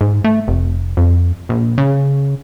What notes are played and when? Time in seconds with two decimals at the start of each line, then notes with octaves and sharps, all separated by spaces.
0.01 G#2
0.24 A3
0.48 F1
0.97 F2
1.49 A#1
1.78 C#3